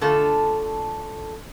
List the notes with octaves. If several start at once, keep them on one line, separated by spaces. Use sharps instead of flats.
D3 A3 F4 A4